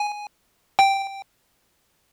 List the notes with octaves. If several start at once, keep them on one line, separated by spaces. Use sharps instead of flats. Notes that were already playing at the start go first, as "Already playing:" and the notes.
Already playing: G#5
G5